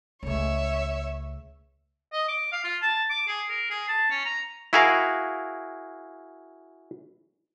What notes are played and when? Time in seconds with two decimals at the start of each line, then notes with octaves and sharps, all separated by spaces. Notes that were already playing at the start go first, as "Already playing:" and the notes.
0.23 C#2 A3 C#5 E5
2.13 D#5
2.28 D6
2.52 F5
2.64 F4
2.82 A5
3.10 D6
3.27 G#4
3.50 A#4
3.70 G#4
3.89 A5
4.10 C#4
4.25 A#5
4.73 E4 F#4 G#4 A#4 F5